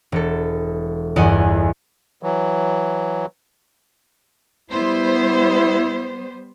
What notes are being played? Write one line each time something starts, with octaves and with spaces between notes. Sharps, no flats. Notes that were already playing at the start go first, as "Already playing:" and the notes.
E1 A4
G1 E2 D#5 F#5 G#5
E3 F#3
G3 B3 E4 C5